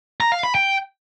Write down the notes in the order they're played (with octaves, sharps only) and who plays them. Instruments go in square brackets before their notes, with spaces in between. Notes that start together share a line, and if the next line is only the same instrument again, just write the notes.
[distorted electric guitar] A#5
F5
B5
G5